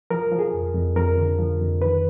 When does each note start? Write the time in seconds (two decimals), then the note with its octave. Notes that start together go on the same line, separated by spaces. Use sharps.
0.10 F3 A#4
0.32 F3
0.39 G#4
0.54 F2
0.74 F2
0.96 F2 A#4
1.18 D3
1.39 F3
1.60 F2
1.81 D#3 B4